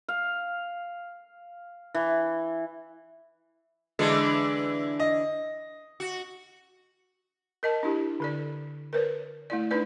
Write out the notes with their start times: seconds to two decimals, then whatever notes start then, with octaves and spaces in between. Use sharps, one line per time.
0.08 F5
1.95 E3
3.99 D3 E3 G#3 D4
5.00 D#5
6.00 F#4
7.63 A#4 D#5 A5
7.83 D4 E4 G4
8.20 D3 A4 D5
8.93 A#4 B4 C#5
9.50 A3 E4 D5
9.71 D4 D#4 B4 D5